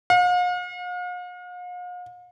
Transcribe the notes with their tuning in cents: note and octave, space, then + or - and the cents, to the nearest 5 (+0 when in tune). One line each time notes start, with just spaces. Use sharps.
F5 +45